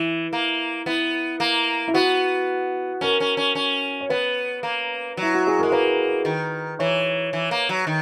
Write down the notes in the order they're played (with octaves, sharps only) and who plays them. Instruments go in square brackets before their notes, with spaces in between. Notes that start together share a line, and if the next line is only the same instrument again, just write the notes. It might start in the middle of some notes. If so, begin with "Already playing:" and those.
Already playing: [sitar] E3 [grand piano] E4
[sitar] A#3
[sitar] B3 [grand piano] E4
[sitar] A#3
[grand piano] E4
[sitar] B3 [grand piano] F#4
[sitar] C#4 [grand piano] A#4
[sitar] C#4
C#4
C#4
[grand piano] C#5
[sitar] B3 [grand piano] B4
[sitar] A#3
[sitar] F#3 [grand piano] E4
[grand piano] F#4
G#4
[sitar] G#3 [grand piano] A#4
[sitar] A#3 [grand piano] B4
[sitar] D#3
[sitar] E3 [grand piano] C#5
[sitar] E3
A#3
F#3
D#3